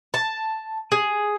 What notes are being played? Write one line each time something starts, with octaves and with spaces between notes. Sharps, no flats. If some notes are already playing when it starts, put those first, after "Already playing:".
A5
G#4